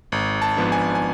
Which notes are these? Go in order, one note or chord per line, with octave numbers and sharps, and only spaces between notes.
G#1
A5
G#2 F3 B3 D4
G#5
G#5